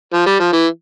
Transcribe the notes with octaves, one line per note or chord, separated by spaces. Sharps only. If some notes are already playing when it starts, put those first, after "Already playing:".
F3
G3
F3
E3